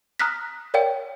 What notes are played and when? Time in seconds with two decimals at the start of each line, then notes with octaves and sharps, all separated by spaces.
0.20 A#5 D#6 F6 F#6 A#6 B6
0.74 A#4 C#5 D5 F5 G5